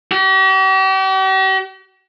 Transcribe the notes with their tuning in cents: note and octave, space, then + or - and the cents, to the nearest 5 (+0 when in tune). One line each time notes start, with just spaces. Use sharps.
G4 -45